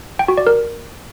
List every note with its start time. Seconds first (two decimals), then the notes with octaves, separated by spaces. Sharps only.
0.19 G5
0.28 F#4
0.37 D5
0.47 A#4